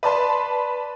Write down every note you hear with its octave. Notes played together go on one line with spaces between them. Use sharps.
B4 D5 A5 C6